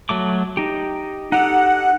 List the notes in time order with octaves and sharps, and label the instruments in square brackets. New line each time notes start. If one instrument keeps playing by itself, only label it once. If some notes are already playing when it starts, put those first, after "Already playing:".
[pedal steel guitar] F#3 A3 D6
D#4 G4
[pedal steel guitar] D#4 G4 A4 [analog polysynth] F#5